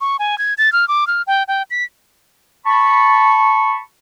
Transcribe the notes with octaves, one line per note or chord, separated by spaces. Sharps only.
C#6
G#5
G#6
A6
F6
D6
F6
G5
G5
B6
A5 B5 C#6